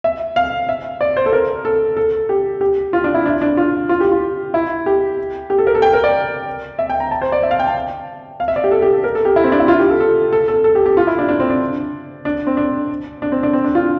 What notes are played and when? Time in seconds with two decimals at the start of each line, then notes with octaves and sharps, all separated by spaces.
0.04 E5
0.36 F5
0.69 E5
1.01 D5
1.17 C5
1.26 A4
1.33 A#4
1.65 A4
1.97 A4
2.29 G4
2.61 G4
2.93 F4
3.04 D4
3.14 E4
3.26 D4
3.41 D4
3.57 F4
3.89 F4
4.00 G4
4.12 F4
4.54 E4
4.86 G4
5.50 G4
5.58 A4
5.67 A#4
5.75 A4
5.82 G5
5.93 A#4
6.04 D5
6.79 E5
6.90 G5
7.00 A#5
7.11 A5
7.22 C5
7.32 D5
7.43 E5
7.51 F5
7.59 G5
7.67 A5
8.40 F5
8.48 E5
8.56 D5
8.64 G4
8.71 A4
8.82 G4
8.93 A4
9.04 A#4
9.15 A4
9.25 G4
9.36 E4
9.44 C4
9.52 D4
9.60 E4
9.68 F4
9.79 G4
9.90 A4
10.00 A4
10.33 A4
10.48 A4
10.64 A4
10.75 G4
10.86 G4
10.97 F4
11.07 E4
11.19 D4
11.29 D4
11.40 C4
11.50 D4
12.25 D4
12.47 C4
12.57 D4
13.22 D4
13.32 C4
13.43 D4
13.53 C4
13.64 D4
13.75 F4